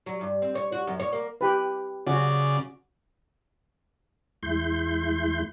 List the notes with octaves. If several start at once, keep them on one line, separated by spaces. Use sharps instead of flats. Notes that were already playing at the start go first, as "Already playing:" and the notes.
F#3
G2
C4
C#5
F#4
F#2
C#5
A#3
G4 B4
C#3 C#4 F#4 D5
E2 G#3 E4 C6 G6